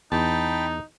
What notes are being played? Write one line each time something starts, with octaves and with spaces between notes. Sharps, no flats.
E2 D#4 G5 A5 B5